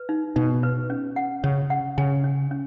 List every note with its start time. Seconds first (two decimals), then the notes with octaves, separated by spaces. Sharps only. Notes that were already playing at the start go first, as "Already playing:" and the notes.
Already playing: B4
0.09 D#4
0.36 B2 D#4
0.63 B4
0.90 C#4
1.16 F#5
1.43 C#3 C#4
1.70 F#5
1.98 C#3 G#5
2.24 C#4
2.51 C#4